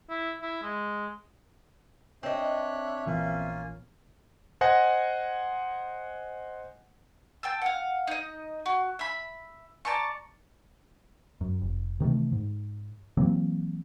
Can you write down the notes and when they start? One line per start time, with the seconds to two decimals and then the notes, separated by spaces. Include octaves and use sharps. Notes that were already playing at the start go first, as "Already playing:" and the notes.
0.10 E4
0.42 E4
0.63 G#3
2.23 C4 D4 C#5 D#5 E5 F#6
3.06 A#1 E3 A#3 B3 C#4 F4
4.61 C5 D#5 F#5 G#5 A#6
7.43 G5 A5 E6
7.62 F5 F#5
8.07 D#4 D#5
8.66 F#4
8.99 E5 B5
9.85 D5 A5 A#5 C#6
11.41 F#2
11.62 F1
12.00 C3 D#3 E3 A3
12.32 G#2
13.17 E3 F#3 A#3 C4